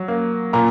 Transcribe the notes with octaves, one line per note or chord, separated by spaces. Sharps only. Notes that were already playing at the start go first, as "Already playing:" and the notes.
Already playing: F#3
A#3
A#2 A#5